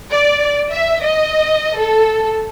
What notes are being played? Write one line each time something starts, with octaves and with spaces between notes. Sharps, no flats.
D5
E5
D#5
A4